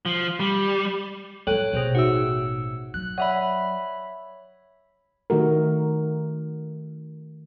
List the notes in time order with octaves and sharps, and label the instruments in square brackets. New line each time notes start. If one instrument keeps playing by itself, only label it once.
[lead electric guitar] F3
G3
[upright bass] A1 F#3 [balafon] A4 [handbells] C#5 G5 F#6
[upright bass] A1 B2 [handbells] G#4 C5 C#5
[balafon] D#4 F#4 E5 [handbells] F#5 E6
[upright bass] F#3 [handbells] F#6
[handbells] C#5 E5 B5 [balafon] D5 F#5
[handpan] D#3 A3 F#4 A#4